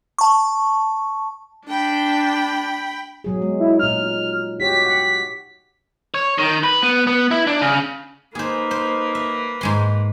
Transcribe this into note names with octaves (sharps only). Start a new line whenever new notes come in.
A5 C#6
D4 G5 B5
B2 F#3 G#4
G#3
E4
A#2 D#4 F6
F#4 G4 C#5 B6
F#5
C#5
D#3
B4
B3
B3
E4
D4
C#3
A#3 D#4 G#4 B4 C5
C5 C6
E5
G#2 G#3 C6